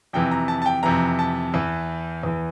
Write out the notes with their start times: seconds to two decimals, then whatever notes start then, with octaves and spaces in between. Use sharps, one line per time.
0.13 F2 C3 E3 G5
0.31 A#5
0.48 A5
0.62 A5
0.66 G5
0.83 F2 C3 E3 A#5
1.19 A5
1.54 E2 E3
2.23 E2 E3